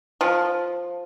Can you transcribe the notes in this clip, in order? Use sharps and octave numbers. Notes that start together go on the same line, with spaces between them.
F3